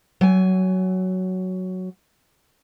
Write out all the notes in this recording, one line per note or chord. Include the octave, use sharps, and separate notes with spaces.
F#3 G#5